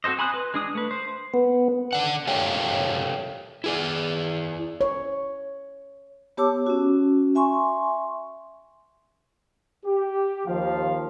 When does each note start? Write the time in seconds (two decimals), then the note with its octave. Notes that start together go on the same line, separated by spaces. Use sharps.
0.04 C4 F#4 A4 C5 D#5
0.19 G#5 B5 C6 D#6 F#6
0.34 B4
0.54 G#3 D4 D#6
0.75 A3 B4
0.91 C5
1.34 B3
1.93 D3 D5 F#5
2.27 G4 A4 A#4 C#5 F5 G5
3.64 E4 G#4 D5
4.81 C#5
6.37 B3 G4 C#5 A5 D6 E6
6.66 C#4 F#4
7.35 E5 G#5 C6 C#6
9.85 G4
10.46 D#2 F3 F5